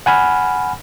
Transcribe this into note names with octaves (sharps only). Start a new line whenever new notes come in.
F#5 G#5 B5 F6